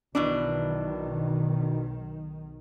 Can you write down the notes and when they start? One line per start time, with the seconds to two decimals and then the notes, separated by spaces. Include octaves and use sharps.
0.15 B1 B2 D#3 E3 D4